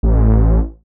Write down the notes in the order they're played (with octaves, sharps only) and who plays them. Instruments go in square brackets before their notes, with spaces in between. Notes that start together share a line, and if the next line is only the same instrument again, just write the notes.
[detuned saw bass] A1